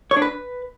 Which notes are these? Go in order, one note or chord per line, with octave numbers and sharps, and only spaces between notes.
C#5
D4
B4